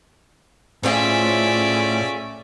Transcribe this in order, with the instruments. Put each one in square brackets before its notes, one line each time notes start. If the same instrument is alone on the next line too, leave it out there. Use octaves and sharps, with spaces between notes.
[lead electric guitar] A2 [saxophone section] A3 C#4 [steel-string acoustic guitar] F4 G#4 C5 [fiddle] D5 E5